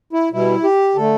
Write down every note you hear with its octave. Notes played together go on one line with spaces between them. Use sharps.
E4
B2 G3 E4
G4
D3 A3 A4